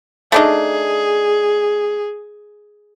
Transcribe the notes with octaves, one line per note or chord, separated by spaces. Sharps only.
A3 D4 D#4 G#4